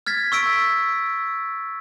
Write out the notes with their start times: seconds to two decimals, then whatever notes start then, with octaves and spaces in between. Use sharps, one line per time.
0.06 F6 G#6 A6 B6
0.32 C#6 E6 B6 D7